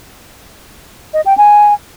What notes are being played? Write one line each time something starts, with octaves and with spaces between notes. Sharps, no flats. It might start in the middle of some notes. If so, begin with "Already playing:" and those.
D#5
G5
G#5